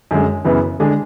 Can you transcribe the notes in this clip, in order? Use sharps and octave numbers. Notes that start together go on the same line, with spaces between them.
F#2 D3 G#3
F#2 C#3 E3 B3
D3 G#3 D4 G#4